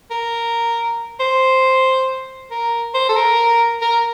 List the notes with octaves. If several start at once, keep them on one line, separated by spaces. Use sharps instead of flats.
A#4
C5
A#4
C5
A4
A#4
A#4